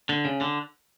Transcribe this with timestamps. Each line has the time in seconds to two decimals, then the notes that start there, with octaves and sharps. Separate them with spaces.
0.09 D3
0.25 C#3
0.41 D3